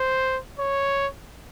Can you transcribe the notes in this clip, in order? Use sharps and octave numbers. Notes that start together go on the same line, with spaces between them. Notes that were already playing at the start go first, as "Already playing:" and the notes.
Already playing: C5
C#5